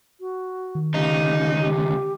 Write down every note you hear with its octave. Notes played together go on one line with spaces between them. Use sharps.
F#4
D#3
D2 C#3 D#4 G4
G4